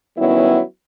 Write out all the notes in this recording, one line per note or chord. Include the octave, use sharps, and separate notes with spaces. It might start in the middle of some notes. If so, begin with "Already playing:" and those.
D#3 F#3 G3 B3 C#4 E4